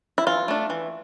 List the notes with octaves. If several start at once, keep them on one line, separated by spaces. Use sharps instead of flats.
E4
E3 F4
A3 D4
E3